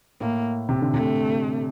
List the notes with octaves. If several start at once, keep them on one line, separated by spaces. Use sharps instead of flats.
A2 A#3
C3
D3
C3 A3